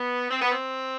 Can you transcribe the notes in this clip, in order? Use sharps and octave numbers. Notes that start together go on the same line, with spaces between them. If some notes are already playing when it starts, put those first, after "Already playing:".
Already playing: B3
C4
B3
C4